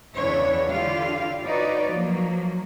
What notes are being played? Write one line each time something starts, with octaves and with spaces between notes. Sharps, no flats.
E2 C#3 E3 D4 C#5 E5
D3 E4 F4 G4 F5
D#4 F#4 B4 C#5 D5
F3 F#3 A#3